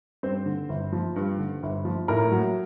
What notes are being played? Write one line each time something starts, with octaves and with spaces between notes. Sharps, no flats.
G2 C4 C5
D3
G1
F3
G2
D3
G1
F3
A2 A#4
F#3